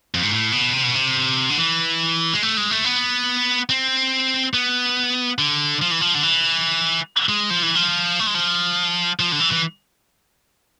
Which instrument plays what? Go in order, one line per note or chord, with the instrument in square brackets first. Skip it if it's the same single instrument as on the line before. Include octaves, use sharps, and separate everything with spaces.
[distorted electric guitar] F2
G#2
A2
B2
C3
B2
C3
D3
E3
G#3
A3
G#3
A3
B3
C4
B3
D3
F3
E3
F3
D3
E3
G#3
F3
E3
F3
A3
G#3
F3
F3
D3
E3
E3